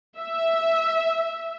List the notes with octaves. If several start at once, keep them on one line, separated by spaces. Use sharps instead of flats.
E5